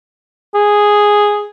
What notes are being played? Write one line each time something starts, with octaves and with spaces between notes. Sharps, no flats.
G#4